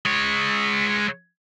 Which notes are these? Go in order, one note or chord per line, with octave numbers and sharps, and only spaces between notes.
G#3 C#5